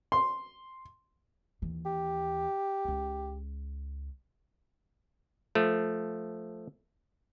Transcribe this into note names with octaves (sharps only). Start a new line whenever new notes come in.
C6
D#2 E3
G4
C#2 C#3
F3 A3